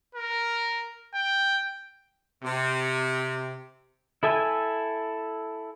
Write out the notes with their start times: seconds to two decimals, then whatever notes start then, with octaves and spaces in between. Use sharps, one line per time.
0.15 A#4
1.15 G5
2.42 C3
4.23 E4 A4 E5 G#5